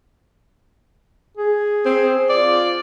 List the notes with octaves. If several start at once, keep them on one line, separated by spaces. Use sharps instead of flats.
G#4
C4
F4 D5